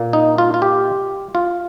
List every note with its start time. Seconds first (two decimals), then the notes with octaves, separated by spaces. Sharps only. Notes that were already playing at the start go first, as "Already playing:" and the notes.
Already playing: A#2 A#3
0.13 D#4
0.38 F4
0.54 F4
0.62 G4
1.35 F4